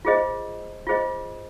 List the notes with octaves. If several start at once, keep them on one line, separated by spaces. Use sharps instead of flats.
F4 G#4 C5 D#5
F4 G#4 C5 D#5